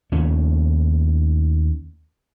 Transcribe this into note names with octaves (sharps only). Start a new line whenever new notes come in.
D#2 A3 C#4